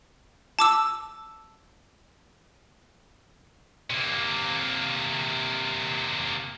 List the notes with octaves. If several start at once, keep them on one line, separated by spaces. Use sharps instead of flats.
A5 D6 E6
C3 A#3